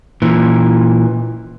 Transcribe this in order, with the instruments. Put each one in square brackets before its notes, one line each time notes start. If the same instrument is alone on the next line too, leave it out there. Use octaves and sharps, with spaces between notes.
[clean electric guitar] A#2 E3